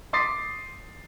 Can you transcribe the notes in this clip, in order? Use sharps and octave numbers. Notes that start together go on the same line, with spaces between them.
C6 D6 D#6 A6 B6 C7